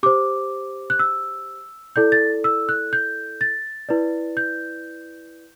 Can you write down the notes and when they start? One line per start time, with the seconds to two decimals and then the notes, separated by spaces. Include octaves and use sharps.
0.03 G4 C5 D6
0.90 F#6
0.99 E6
1.96 E4 A4 D5 G6
2.12 A6
2.44 E6
2.69 F#6
2.93 G6
3.41 A6
3.89 E4 B4 D5
4.37 G6